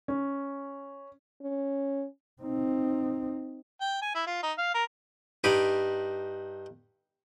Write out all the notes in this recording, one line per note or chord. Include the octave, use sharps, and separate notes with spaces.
C#4
C#4
C4 D#4
G5
G#5
E4
F4
D#4
F5
A#4
G2 D#4 B5 D6